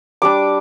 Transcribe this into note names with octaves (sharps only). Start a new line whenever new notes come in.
G3 D4 D6